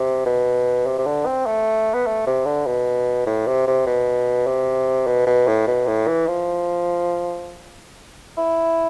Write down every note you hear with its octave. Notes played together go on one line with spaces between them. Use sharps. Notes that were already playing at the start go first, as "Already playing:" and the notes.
Already playing: C3
B2
C3
C3
D3
C4
A3
B3
A3
C3
D3
B2
A2
C3
C3
B2
C3
B2
B2
A2
B2
A2
E3
F3
E4